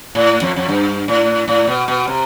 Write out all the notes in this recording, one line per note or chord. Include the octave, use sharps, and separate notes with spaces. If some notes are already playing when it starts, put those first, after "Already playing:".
A2
F2
F2
G2
A2
A2
B2
B2
C3